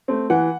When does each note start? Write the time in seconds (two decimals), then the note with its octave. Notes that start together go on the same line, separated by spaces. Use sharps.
0.08 A3 C4
0.30 E3 F#5